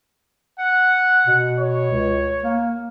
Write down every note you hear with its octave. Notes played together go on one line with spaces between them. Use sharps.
F#5
B2
C#5
C#2
A#3